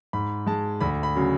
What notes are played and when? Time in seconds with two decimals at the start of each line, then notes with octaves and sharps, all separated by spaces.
0.13 G#2 B5
0.47 G#3 A5
0.80 D2 B5
1.03 B5
1.15 C#3 F#3